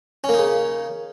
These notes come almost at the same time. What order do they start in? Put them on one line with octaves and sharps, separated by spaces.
C#4 A#3 D#4 C#3